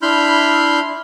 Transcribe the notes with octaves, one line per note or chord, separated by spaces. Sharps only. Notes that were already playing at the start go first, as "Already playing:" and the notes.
D4 E4 B5 C6 F6 G6